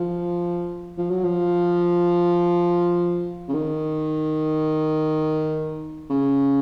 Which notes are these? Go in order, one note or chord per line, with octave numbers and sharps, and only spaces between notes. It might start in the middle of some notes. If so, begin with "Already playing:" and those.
Already playing: F3
F3
F#3
F3
C#3
D#3
C#3